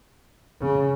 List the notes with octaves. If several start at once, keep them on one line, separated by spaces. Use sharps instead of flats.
C#3